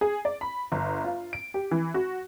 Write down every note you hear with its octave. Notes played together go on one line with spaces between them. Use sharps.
G#4
D5
B5
G1
F4
D7
G4
E3
F#4